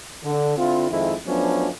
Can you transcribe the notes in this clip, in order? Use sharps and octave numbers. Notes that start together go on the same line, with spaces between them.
D3
D3 C4 E4 F4
F2 D#3 G#3 E4
F3 F#3 A3 B3 C#4 D4